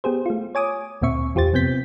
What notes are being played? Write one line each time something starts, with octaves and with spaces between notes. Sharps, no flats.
B3 G4 G#4 C5
A3 F4
C#5 G#5 D6 D#6
D2 A#2 C4 E5 C#6
E2 F4 G4 C5 A6
F2 C3 B3 C4 G6 B6